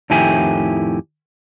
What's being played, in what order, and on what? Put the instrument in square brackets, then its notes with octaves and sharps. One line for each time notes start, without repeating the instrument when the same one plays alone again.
[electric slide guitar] F2 A2 D#3 E4 G4 G#5